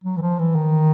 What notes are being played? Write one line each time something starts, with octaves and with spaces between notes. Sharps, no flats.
F#3
E3
F3
E3
D#3